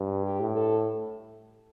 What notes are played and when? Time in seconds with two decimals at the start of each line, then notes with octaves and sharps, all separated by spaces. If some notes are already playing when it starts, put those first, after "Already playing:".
Already playing: G2
0.24 G4
0.40 A2
0.55 A4